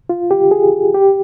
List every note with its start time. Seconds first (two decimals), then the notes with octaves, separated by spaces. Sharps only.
0.09 F4
0.31 G4
0.51 G#4
0.95 G4